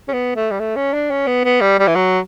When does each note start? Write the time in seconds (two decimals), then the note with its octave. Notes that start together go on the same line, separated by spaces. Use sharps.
0.08 C#4
0.13 B3
0.36 A3
0.51 G3
0.60 A3
0.76 C#4
0.94 D4
1.11 C#4
1.27 B3
1.44 B3
1.61 G3
1.79 G3
1.88 E3
1.96 F#3